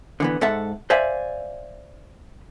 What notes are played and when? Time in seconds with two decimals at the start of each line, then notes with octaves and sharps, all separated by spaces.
0.20 D3 E3 B3
0.41 G#2 A4 E5 F#5 A5
0.90 C5 D5 E5 F5 G#5